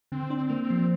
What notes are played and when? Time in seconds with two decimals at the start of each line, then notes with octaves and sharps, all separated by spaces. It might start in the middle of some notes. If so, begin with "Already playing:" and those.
0.12 D3 C4
0.30 D4
0.37 C4
0.50 A#3
0.63 C4
0.70 F3